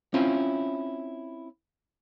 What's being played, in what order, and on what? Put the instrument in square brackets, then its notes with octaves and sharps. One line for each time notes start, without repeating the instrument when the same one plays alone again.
[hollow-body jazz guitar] C4 C#4 E4 F4